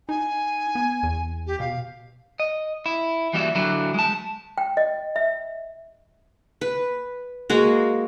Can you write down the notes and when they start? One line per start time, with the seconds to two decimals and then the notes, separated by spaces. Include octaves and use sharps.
0.09 D#4 G#5
0.75 B3
1.03 E2
1.47 G4
1.60 B2 F5
2.40 D#5
2.86 E4
3.33 E3 G3 A#3 F#4 C#5 E5
3.55 D3 F#3 E4 F#4
3.94 G#3 A5
4.58 G5
4.77 D#5
5.16 E5
6.61 B4
7.50 G#3 A#3 F#4